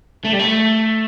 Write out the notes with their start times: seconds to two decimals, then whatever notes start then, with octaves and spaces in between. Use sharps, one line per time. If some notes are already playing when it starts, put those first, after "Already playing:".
0.25 A3
0.33 G3
0.39 A3